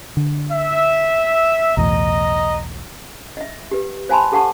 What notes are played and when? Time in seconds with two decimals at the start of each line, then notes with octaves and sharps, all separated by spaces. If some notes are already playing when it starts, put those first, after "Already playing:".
0.17 D3
0.52 E5
1.77 B1 E2 A2 D#5 A#5
3.37 D#5 E5
3.71 G4 B4
4.09 C5 F5 G#5 A5 B5 C6
4.32 G4 A4 F5 F#5 A5 C#6